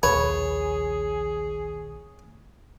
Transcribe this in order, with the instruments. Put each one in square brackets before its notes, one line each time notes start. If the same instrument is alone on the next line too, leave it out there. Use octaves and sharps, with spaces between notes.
[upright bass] A#1 D#2 [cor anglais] G#4 [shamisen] B4 [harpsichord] C#5